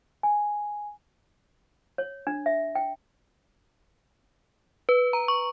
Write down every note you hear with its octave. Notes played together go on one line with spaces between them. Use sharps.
G#5
C#5
D4
E5
G5
B4
A#5
C#6